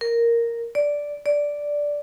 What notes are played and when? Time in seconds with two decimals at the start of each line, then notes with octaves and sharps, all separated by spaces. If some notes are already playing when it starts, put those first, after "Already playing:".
0.01 A#4
0.75 D5
1.26 D5